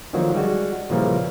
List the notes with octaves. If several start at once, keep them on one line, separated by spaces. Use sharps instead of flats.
D3 D#3 F3 F#3 A#3
G3 G#3 F#4
A#2 C#3 E3 F3 G3 A#3